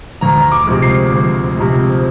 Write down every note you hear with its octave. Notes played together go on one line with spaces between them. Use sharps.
D2 A#5
D6
C3 F3 G#3
C7
D2
C3 F3 G#3